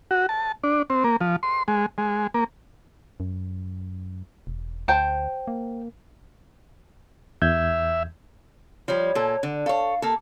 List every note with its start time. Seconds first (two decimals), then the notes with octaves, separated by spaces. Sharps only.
0.11 F#4
0.29 A5
0.64 D4
0.90 C4
1.04 A#3
1.21 F3
1.43 C6
1.68 G#3
1.98 G#3
2.34 A#3
3.20 F#2
4.47 E1
4.88 D2 C5 G5 A5
5.47 A#3
7.42 E2 E5 G6 G#6
8.88 F3 G3 C#5
9.15 A#2 A4
9.43 D3
9.66 A4 C#5 F5
10.02 A#3 A4